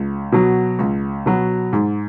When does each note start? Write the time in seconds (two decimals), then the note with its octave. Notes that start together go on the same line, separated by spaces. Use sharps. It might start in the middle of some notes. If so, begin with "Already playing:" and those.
Already playing: C#2
0.32 B2 F#3
0.79 C#2
1.26 B2 F#3
1.73 G#2